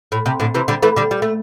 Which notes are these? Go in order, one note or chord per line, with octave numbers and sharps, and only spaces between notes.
A2
C3
A2 D3
C3 E3
D3 G3
E3 A3
D3 G3
G3
A3